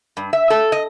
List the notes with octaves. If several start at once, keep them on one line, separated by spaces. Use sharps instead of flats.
G2
E5
A4
D#5